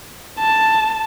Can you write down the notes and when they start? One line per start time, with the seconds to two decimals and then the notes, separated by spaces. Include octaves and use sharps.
0.39 A5